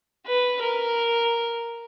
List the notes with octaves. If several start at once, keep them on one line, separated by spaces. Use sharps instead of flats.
B4
A#4